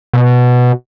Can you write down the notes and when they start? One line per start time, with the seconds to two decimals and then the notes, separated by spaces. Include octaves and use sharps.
0.14 B2